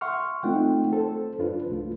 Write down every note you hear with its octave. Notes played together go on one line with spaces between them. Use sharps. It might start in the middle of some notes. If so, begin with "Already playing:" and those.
E5 F#5 C6 C#6 F6
A3 C4 D#4 F4 F#5 G5
A4 C5
F#2 D4 F4 B4
C2 A3 F4